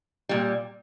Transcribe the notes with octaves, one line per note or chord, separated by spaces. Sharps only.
A#2 G3